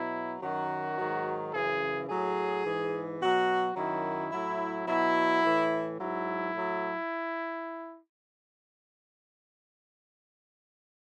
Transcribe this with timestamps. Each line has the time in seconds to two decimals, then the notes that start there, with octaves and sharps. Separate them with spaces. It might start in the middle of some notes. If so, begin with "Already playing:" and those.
Already playing: B2 F#3 E4
0.42 F#2 D#3 F#3 F#4
0.98 G#2 D#3 F#3
1.53 F#2 C#3 E3 G#4
2.09 A2 F#3 G#4
2.64 G#2 E3
3.21 B2 F#3 F#4
3.76 F#2 D#3 F#3 E4
4.31 A2 F#3 E4
4.87 B2 F#3 E4
5.43 A2 E3
5.98 G#2 F#3 E4
6.55 A2 F#3